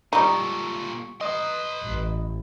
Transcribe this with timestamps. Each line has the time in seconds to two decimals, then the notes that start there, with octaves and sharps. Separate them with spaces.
0.13 A#2 G3 D#4 A4 C#6
1.21 B4 D#5 C6 D#6
1.84 A1